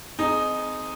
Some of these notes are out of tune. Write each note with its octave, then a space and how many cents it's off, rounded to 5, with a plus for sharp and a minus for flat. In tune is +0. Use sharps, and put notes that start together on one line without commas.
C4 -15 D#4 -5 G#4 +25